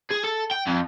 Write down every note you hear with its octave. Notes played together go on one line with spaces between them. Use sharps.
G#4
A4
G5
F2